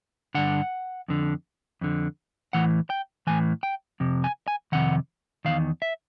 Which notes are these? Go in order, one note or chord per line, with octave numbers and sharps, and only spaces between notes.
G2 D3 F#5
F2 D3
F2 D3
A2 E3 F#5
G5
A2 E3 G#5
G5
F2 C3
G#5
G#5
F2 C3 D#3 F#5
E2 C3 D#3 F5
E5